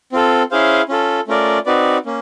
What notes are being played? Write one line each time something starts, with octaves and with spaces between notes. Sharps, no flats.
C4 F4 A4
C#4 E4 G#4 C5 F5
C#4 F4 A4
A3 C#4 F4 A#4 D5
C4 D#4 F#4 B4 D5
A#3 C#4